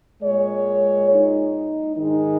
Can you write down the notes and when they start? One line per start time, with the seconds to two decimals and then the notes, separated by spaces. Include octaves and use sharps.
0.23 A#2 G#3 C#5
1.10 D#4
1.97 G#2 D#3 G#3 D#4